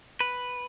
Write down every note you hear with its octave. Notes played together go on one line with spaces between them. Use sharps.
B4